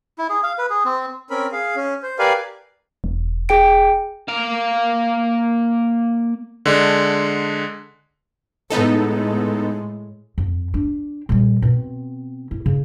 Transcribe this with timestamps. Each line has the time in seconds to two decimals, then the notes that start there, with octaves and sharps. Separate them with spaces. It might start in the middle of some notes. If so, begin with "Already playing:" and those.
0.18 E4
0.30 G#4
0.43 F5
0.58 B4
0.70 G#4
0.85 C4
1.30 C4 C#4 A#4 B5
1.52 G#4 F5
1.76 C#4
2.03 C5
2.19 G4 A#4 B4 D5 F5 G#5
3.04 E1
3.49 G#4 G5 D7
4.28 A#3 F5
6.66 D3 G#3 D4
8.70 A2 G#3 B3 D#4 A4
10.38 F2
10.74 D4
11.29 A#2 G3
11.62 B2 C4
12.51 E4
12.66 C#3